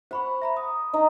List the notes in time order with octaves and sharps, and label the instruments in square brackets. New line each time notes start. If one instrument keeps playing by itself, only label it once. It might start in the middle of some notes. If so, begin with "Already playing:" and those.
[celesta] C5 B5 C#6 [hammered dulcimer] F#5
[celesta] E5 A#5 B5
D#6
[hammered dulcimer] D#4 D#5 A#5